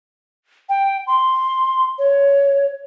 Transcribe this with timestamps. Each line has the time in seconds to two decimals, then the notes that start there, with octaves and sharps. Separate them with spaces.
0.69 G5
1.07 C6
1.98 C#5